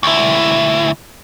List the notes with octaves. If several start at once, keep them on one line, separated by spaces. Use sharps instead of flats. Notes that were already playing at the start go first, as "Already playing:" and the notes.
D2 E4